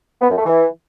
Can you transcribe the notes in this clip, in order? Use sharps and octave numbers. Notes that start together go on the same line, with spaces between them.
B3
F#2
A3
E3